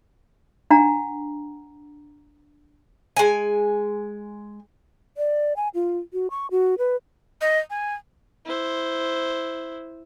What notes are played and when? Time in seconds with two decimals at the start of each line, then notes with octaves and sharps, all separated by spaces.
0.70 D4 F#5 A#5
3.16 G#3 G#5
5.17 D5
5.56 G#5
5.75 F4
6.13 F#4
6.30 C#6
6.51 F#4
6.78 B4
7.41 D#5
7.70 G#5
8.46 E4 C5